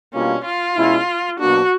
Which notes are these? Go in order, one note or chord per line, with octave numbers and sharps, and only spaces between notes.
B2 G3 A#3 C#4 D4 F4
F4
B2 G#3 C#4 E4
B2 F#3 A#3 D4 F#4